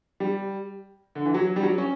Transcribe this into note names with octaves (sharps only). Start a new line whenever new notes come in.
G3
D3
E3
F#3
G3
F#3
C#4